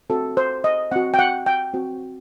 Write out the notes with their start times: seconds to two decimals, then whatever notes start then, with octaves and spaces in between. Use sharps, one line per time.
0.10 C4 F#4 A4
0.37 C5
0.64 D#5
0.91 C4 F#4 F#5
1.14 G5
1.19 F#5
1.46 G5
1.74 C4 F#4